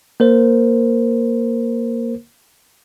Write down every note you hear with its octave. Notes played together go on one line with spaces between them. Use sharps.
A#3 A#4 C5